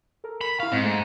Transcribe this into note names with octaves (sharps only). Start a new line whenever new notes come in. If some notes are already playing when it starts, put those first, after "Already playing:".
A4 A#4
B5
E4 F5 C#6
G#2 C4
A3